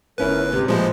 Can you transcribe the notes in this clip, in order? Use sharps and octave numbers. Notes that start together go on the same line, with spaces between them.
G1 D2 C#4 E4 A#4 B4
G#2 C3 G4
A#2 F3 G#3 A#3 E4 G#4 C5